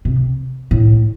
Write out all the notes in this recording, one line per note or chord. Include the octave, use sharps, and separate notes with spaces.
C3
A2